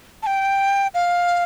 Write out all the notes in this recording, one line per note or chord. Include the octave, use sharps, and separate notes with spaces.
A5
G5
F5